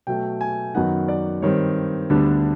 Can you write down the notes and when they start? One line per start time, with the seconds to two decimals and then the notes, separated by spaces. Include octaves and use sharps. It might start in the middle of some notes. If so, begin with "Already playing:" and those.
0.07 B2 F#3 A3 G5
0.41 G#5
0.75 F#2 D#3 F#3 B3 D#4 F#5
1.08 D5
1.42 G2 D#3 G3 C4 C#5
2.10 D2 D3 G3 B3 D4